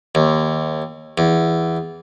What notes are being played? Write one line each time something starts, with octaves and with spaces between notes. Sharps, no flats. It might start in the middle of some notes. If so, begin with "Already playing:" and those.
D#2
E2